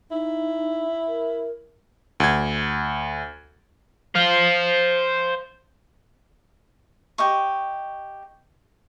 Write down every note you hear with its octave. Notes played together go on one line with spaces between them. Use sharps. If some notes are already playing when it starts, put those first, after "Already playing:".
D#4 E4
A#4
D2 G#6
C5 F5
G4 D#5 C#6